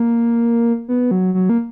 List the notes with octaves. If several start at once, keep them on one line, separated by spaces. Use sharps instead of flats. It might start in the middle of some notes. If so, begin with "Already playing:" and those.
Already playing: A#3
B3
F#3
F#3
A#3